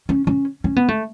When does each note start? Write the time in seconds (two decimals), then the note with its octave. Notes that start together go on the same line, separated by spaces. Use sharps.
0.09 C#4
0.27 C#4
0.64 C#4
0.76 B3
0.88 A3